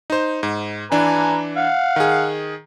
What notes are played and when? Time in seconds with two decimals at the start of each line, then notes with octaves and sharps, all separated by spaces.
0.10 D#4 C5
0.43 G#2
0.92 E3 D4 B4 G#5 A#5
1.57 F5 F#5
1.96 D#3 G#4